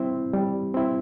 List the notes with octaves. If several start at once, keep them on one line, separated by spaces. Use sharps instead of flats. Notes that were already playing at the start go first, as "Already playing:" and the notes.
Already playing: G3 C4 E4
G3
C4 E4